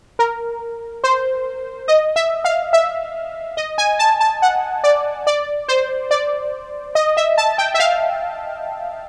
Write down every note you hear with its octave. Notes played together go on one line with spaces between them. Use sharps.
A#4
C5
D#5
E5
F5
E5
D#5
G#5
A5
A5
F#5
D5
D5
C5
D5
D#5
E5
A5
G5
E5
F5